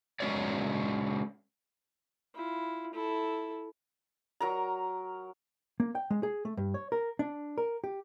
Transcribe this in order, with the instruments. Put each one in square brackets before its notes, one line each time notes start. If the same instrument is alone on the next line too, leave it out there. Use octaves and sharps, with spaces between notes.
[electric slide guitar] G#3 C#4 F#4 C#5 D5
[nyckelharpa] E4 F4
E4 A4
[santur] F#3 A#4 A#5
[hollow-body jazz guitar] A#3
G5
G#3
G#4
A3
G2
C#5
A#4
D4
A#4
G4